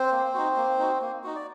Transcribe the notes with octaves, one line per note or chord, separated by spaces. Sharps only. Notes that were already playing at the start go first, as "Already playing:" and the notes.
Already playing: C4 C5
A#3
D#4 F#4
A#3
D#4 F#4
A#3
D#4 F#4
D5